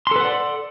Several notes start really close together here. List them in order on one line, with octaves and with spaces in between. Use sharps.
C6 A4 B4 F#5 D5